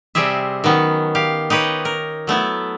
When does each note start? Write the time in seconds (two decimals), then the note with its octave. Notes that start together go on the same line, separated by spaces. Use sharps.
0.15 C3 G3 C4 G4 G#4 E5
0.64 D#3 F#3 B3 C#4
1.15 G4 F5
1.50 D#4 G4 B4 C#5 D#5
1.85 A#4
2.27 F#3 A3 B3 E4